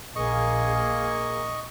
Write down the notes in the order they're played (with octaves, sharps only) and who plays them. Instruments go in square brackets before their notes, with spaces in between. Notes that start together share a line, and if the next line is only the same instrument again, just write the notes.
[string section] A#1 [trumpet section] A#3 [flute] G#4 [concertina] D#5 C#6